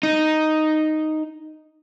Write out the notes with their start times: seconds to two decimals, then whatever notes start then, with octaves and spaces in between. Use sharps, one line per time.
0.03 D#4